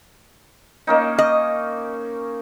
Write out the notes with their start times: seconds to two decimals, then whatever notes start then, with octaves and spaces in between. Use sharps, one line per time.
0.87 A#3 C#4 D#4
1.18 D#5